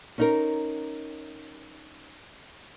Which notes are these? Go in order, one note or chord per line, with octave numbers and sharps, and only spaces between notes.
C#4 D#4 A#4